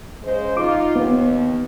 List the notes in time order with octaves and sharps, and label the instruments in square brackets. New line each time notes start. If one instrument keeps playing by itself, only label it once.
[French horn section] C#3 G#3 C5
[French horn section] D#4 F4 [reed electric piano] D6
[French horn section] D#2 [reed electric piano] B3